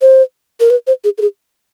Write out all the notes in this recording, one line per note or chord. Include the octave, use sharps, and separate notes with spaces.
C5
A#4
B4
C5
G#4
A4
G#4